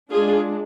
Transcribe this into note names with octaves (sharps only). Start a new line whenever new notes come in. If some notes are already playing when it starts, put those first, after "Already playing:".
G#3 D4 F4 G#4